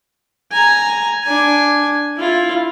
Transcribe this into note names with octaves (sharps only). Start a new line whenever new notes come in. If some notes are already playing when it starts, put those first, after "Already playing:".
G#5 A#5
D4 G#5
E4 F4